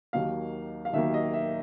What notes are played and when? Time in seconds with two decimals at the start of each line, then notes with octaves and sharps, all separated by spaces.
0.13 D#2 D#3 F#3 A#3 F5
0.85 F5
0.93 D#2 D#3 F#3 A#3 E5
1.14 D#5
1.33 E5